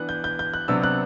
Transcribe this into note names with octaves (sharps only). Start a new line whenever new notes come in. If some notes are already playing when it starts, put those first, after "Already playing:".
Already playing: E3 B3 D4 F#6
G6
G6
G6
F#6
C3 F#3 B3 D4 E6
F#6